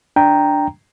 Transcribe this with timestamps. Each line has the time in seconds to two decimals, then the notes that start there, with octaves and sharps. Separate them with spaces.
0.16 D4 G5 A#5